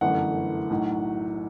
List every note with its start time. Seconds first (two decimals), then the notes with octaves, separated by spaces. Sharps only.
0.01 G1 F#2 E3 A3 F#5
0.70 B1 A2 F#3